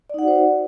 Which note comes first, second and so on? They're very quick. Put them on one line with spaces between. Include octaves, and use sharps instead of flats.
D5 D#4 F#5 F#4 C5